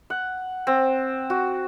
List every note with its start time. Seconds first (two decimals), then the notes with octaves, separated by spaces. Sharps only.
0.10 F#5
0.67 C4
1.30 F#4